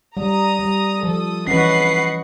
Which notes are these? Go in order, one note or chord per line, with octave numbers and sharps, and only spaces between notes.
G3 A#5 D#6
G3
F3 A4 D#6
E3 C#4 B4 D#5 F#5 C#6 C7